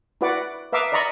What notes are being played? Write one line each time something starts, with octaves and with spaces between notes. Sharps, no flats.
E4 F#4 B4 D5 F#5 D6
B4 E5 F5 A#5 D6 D#6
D5 D#5 A#5 B5 C#6